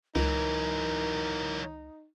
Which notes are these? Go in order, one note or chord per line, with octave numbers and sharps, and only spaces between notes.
C#2 E3 F#3 D#4 A#4